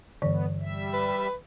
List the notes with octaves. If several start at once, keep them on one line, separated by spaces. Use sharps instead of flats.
G2 D3 E3 B3 D5
G3 E5
B4